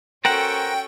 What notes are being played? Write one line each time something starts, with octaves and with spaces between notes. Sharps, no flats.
C#4 F#4 A4 A#4 C5 F#5 G5